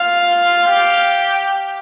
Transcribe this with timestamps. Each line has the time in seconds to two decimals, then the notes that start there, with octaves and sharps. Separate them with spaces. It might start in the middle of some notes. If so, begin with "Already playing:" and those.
Already playing: F4 F5
0.66 G4